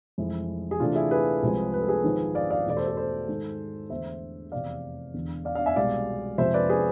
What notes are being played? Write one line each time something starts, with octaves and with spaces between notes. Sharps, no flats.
F1 F2 E3 G#3 E4
G#4
D2 C3 E3 A3 D4 F4
E4 G#4
G#4 B4
C2 C3 F3 G#3
B4
A4
G#4 B4
G#1 G#2 F3
D5 F5
D5 F5
E2 B2 A3 D5
A4 C5
A4 C5
A4 C5
G#1 G#2 G#3
E2 D3 A3 C5 E5
F1 E2 C3 D5 F5
E1 E2 D3
D5 F5
D5 F5
E5 G#5
C2 B2 G#3 D5 F5
F2 C3 F3 G#3 C5 E5
B4 D5
G#4 B4